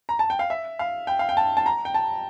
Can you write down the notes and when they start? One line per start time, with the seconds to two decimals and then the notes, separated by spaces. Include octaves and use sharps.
0.09 A#5
0.19 A5
0.30 G5
0.39 F5
0.50 E5
0.79 F5
1.07 G5
1.19 F5
1.29 G5
1.37 A5
1.57 A5
1.66 A#5
1.85 G5
1.94 A5